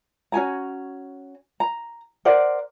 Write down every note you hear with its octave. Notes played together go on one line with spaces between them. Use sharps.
C#4 F#4 G#5 A#5
A#5
A#4 C5 D5 F#5